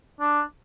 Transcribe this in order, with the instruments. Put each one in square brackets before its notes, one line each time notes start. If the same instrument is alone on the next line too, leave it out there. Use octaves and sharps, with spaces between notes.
[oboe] D4